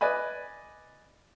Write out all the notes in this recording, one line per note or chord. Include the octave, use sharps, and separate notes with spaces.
B4 D5 D#5 G#5 B5